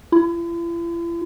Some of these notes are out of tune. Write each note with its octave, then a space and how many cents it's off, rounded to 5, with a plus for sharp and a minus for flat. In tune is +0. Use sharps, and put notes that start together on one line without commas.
E4 +45